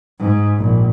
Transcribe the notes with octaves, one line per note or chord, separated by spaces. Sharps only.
G#2
A#1